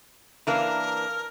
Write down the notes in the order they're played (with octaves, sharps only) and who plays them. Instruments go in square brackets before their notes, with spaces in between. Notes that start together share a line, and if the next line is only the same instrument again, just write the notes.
[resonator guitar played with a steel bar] E3 A#3 D4 [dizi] A#4